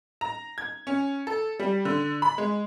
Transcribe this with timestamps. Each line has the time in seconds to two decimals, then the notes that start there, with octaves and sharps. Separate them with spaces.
0.21 A#5
0.58 G#6
0.87 C#4
1.27 A4
1.59 G3
1.85 D3
2.22 B5
2.38 G#3